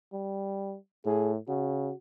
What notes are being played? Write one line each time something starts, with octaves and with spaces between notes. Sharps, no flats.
G3
A2 G#4
C#3 F#4